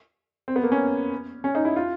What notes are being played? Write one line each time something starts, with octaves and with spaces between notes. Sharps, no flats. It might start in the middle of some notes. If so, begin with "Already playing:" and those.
C4
B3
A#3
C#4
C#4
D#4
E4
F4